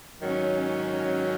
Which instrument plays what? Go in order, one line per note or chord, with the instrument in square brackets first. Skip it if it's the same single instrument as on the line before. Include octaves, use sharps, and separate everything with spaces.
[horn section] G#2 D#3 F#3 [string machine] C#4